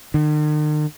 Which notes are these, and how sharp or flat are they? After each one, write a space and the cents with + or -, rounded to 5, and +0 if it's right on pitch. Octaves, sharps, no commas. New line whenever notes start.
D#3 -45